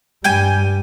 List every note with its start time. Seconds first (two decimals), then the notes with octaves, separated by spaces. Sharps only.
0.24 G2 G3 G5 G#5